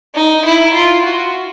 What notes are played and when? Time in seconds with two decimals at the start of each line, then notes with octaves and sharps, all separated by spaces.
0.14 D#4
0.45 E4
0.74 F4
1.04 F#4